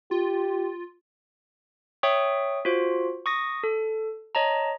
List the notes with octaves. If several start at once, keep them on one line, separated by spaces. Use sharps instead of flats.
F4 G4
C#5 E5 G5 C#6 D#6
F4 F#4 C5
C#6 D#6 A#6
A4
C#5 D#5 A5 A#5